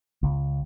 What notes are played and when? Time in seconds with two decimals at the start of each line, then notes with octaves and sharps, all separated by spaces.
0.23 C#2